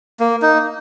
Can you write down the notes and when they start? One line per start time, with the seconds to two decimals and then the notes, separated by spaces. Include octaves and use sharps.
0.20 A#3
0.42 D#4